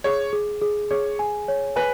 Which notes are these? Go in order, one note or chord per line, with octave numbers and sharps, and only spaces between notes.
G#4 C#5
G#4
G#4
G#4 C#5
G#5
C#5
B4 G#5